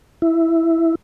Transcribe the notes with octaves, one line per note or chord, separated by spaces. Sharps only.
E4